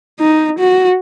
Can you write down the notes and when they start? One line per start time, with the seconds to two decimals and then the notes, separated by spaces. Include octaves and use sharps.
0.20 D#4
0.59 F#4